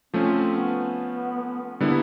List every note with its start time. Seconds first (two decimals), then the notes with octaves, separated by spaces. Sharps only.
0.13 F3 A3 C4 C#4
0.55 B3
1.79 D3 G3 A#3 B3 E4